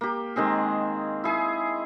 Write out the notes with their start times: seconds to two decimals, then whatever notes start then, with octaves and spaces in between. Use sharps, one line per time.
0.01 A#3 G4
0.36 D#3 G#3 C4 G#4
1.24 E4 G#4